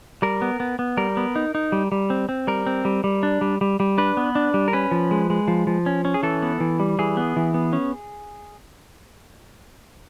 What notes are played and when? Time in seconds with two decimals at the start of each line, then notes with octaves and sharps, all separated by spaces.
0.22 G3 A#4
0.42 B3
0.60 B3
0.79 B3
0.97 G3 A#4
1.17 B3
1.36 D#4
1.55 D#4
1.72 G3
1.92 G3
2.10 C4
2.29 C4
2.47 G3 A#4
2.67 C4
2.85 G3
3.04 G3
3.23 D4
3.41 G3
3.61 G3
3.80 G3
3.98 D4 B4
4.17 B3
4.35 D4
4.54 G3
4.68 A#4
4.73 C#4 B4
4.91 F3
5.11 G#3
5.30 G#3
5.48 F3
5.67 F3
5.86 C#4
6.05 C#4
6.14 G#4
6.23 E3 A4
6.42 B3
6.60 E3
6.80 G3
6.99 E3 G#4
7.17 B3
7.36 E3
7.54 B3
7.73 C#4